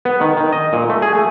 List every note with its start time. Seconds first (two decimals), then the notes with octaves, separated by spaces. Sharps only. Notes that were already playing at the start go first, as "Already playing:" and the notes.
0.05 B3
0.21 D#3
0.37 D#3
0.53 D#5
0.73 A#2
0.90 A3
1.02 G#4
1.15 A3